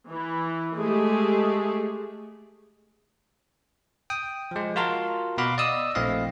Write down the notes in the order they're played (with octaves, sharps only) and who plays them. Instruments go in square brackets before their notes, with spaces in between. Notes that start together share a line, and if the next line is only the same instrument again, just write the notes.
[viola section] E3
G#3 A3 G4 G#4
[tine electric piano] G5 D#6
F3 G#3
F4 F#4 A#4 A5 C6
B2 F#4 F5 B5 D6
D5 D#5 D#6 E6
A#1 A3 C4 E4 D#5 F5